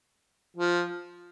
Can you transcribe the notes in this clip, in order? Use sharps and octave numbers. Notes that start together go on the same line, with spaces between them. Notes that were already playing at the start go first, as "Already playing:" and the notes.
F3